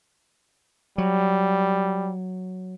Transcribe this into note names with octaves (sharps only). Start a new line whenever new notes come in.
F#3 G3